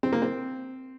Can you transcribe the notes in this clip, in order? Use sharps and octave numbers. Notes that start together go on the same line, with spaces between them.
C4
A#3
C4